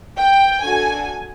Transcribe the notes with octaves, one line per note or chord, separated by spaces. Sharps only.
G5
D4 F#4 A4 G#5